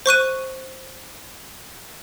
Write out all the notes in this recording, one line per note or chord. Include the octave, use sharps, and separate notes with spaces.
C5 C#6 F#6 D#7